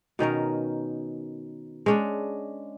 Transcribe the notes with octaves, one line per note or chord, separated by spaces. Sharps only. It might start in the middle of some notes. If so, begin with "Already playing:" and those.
B2 D#3 C#4 A#4
G#3 C#4 D4